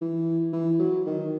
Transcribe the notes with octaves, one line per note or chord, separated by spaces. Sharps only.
E3
E3
F#3
D#3